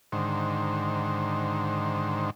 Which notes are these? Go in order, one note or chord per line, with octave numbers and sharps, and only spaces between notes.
G#2 D3 D#3 C5